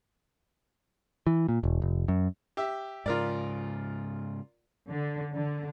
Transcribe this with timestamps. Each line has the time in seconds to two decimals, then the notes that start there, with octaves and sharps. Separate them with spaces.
1.27 E3
1.49 A#2
1.63 E1
1.82 F1
2.08 F#2
2.57 G4 E5
3.06 G#2 C#3 F4 A#4 D5
4.92 D3
5.34 D3